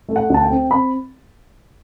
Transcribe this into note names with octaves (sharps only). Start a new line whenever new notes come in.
A3
F#5
D2 A5
G5
C4
C4 B5